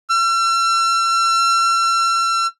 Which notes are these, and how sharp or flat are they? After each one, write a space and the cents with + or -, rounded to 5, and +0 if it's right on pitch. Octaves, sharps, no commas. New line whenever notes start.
E6 +45